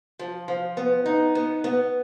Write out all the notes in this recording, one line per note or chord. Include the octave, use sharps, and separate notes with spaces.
F3
F3
B3
D#4
B3
B3